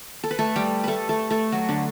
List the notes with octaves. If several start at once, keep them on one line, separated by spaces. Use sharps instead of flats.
A4
B4
A3 A4
G3 G4
A3 A4 B4
A3 A4
A3 A4
F#3 F#4
D3 D4